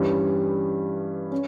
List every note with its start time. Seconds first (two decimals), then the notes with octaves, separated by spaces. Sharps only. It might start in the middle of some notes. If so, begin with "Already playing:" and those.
Already playing: G2 E3 G3 C#4
1.31 C#4